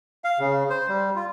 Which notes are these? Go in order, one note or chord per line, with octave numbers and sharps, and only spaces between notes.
F5
C#3
C5
G3
F4